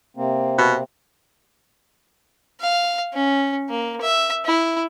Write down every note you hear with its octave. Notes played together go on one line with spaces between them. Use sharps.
C3 A#3 C4
B2
F5
C#4
A#3
E5
E4